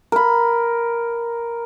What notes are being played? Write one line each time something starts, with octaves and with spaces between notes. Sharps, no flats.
A#4 B5